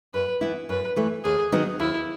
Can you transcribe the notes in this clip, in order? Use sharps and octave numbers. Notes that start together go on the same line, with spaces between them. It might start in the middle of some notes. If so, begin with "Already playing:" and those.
F#2 B4
E3 B3 E4
F#2 B4
E3 A3
D#2 G#4
D#3 F#3 B3 D#4
D#2 E4